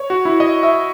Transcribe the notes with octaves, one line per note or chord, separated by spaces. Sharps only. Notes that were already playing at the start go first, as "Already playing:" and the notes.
Already playing: C#5
F#4
E4
D#5
E5